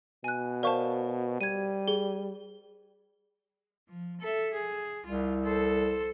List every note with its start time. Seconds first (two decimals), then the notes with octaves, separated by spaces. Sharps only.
0.24 B2 G#5 F#6
0.63 A#4 C5 D5 F5 A5 C#6
1.41 G3 G#6 D#7
1.88 G#4 G7
3.88 F3
4.20 A4 E5
4.53 G#4
5.06 C2 F4
5.43 A4 C5